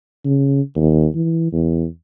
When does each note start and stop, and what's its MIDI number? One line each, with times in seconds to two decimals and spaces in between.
0.25 0.61 49
0.76 1.07 39
1.15 1.47 52
1.52 1.86 40